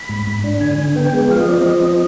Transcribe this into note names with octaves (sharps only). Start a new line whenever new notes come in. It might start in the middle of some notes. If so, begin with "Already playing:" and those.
Already playing: B5
G#2
G#2
D4
D3 G#5
D3
B3 G5
G#3
F3 F5
D#5
C4 D5
D#5
F3
C4